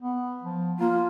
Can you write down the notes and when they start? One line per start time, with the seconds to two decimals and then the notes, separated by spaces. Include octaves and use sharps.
0.01 B3
0.43 F3
0.80 A#3 F4